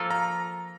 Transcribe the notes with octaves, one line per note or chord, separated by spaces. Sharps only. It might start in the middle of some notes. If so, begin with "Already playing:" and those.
Already playing: F3 A#3 F4 A4
A#5